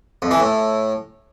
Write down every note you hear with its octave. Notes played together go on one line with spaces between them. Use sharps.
F2
E3
A2